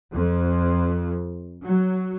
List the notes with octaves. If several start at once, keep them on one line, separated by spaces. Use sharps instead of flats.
F2
F#3